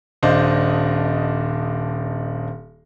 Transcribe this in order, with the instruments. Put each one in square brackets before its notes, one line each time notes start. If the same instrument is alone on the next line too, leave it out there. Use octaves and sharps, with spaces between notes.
[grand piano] D#1 D4 C5 D#5 F5